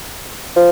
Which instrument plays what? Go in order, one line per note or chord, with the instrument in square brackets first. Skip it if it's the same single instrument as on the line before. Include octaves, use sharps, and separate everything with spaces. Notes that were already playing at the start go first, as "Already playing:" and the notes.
[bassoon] F3